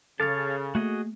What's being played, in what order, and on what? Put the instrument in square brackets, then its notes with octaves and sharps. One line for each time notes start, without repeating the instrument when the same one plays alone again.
[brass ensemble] C#3 [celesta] A4 A6 [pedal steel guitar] C#5 F5 A5
[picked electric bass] A3 A#3 [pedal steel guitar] F#4 G#4 D#5